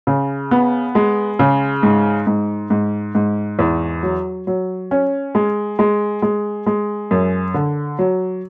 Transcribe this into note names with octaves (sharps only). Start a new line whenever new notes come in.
C#3
B3
G#3
C#3
G#2
G#2
G#2
G#2
E2
F#3
F#3
C#4
G#3
G#3
G#3
G#3
F#2
D3
F#3